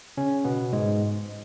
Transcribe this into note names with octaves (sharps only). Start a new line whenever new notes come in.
C#3 C#4
B2 B3
G#2 G#3